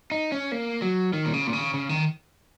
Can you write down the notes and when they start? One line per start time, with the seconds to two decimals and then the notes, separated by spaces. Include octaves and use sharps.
0.12 D#4
0.32 C#4
0.52 A#3
0.82 F#3
1.13 D#3
1.26 A#2
1.34 C#3
1.47 A#2
1.53 C#3
1.74 C#3
1.89 D#3